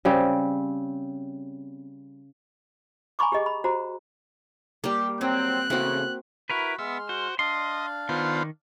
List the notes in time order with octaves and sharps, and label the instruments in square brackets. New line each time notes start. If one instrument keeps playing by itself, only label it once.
[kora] C#3 G3 C4
[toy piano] G#5 A#5 B5 C#6 D6
G4 G#4 D#5
B5
F#4 C5 A#5
[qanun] G3 A#3 [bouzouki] G4
[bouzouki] F#3 [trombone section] C4 [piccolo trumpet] F#6
[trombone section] C#3 A3 [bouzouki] E3 [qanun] A#3 C4 F#4
[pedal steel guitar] E4 A#4 B4 [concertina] F#4 B5
[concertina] G#3 C6 F6 [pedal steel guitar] B3 [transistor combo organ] E5
[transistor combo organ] F#4 [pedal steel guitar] C5
[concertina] D4 D5 F5 [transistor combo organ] D#5 [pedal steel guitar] C6
[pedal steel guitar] D#3 [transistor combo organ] B3 F4 C5